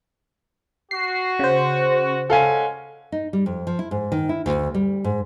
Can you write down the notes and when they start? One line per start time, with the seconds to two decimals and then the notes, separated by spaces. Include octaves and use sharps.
0.91 F#4 C7
1.39 C#3 C5
2.30 G#3 C#4 A4 F5 F#5 G#5
3.12 D#4
3.33 G3
3.46 F2
3.67 F3
3.79 E4
3.91 G#2
4.12 D#3
4.29 E4
4.46 D2
4.75 G3
5.04 G#2